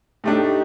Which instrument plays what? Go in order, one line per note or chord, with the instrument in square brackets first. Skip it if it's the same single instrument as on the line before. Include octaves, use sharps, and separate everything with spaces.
[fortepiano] A2 A3 D4 [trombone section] D#4 G4